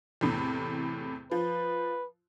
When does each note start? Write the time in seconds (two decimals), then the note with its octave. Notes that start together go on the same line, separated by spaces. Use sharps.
0.21 E2 A2 C3
1.31 F3 B4